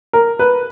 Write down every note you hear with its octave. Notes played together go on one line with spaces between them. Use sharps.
A#4
B4